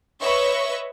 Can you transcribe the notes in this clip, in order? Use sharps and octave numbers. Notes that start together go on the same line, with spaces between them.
B4 C#5 D#5 E5 C#6